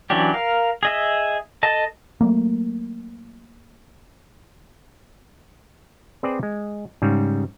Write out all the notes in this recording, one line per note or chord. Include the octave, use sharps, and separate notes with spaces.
E3 F#3 C#4 D4 G4
A#4 F5
G#4 D#5 E5
A4 D#5 A5
F#3 A3 A#3
C4 G#4 B4 C5 D5
G#3
G#2 C#3 G3